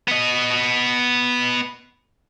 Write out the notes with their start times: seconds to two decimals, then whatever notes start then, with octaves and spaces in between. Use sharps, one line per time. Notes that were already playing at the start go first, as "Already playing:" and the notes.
0.08 B3 D#5